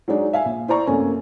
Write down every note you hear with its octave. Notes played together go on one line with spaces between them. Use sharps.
F#3 G#3 D4 D#4
E5 F5 G#5
A#1
E4 C5 D5 A#5 C#6
F#2 C3 A3 A#3 C#4 G#5